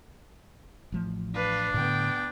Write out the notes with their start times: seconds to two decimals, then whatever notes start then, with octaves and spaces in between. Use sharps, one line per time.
0.92 A1 F3 A3
1.34 D4 B4 F5
1.74 A2 D3 B3 G5